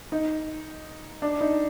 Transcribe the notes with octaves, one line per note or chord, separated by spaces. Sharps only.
D#4
D4
D#4